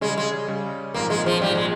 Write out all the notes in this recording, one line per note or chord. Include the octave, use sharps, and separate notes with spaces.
C#3 G3 G#3 C#4
G#3
C#3 G3 C#4
A#1 G#2 F3 A#3 C4
G#3
F3
A#1 G#2 F3 G3 C4
G#3